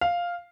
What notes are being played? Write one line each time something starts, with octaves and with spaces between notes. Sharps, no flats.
F5